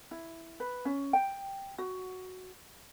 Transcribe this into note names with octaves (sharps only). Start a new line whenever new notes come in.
E4
B4
C#4
G5
F#4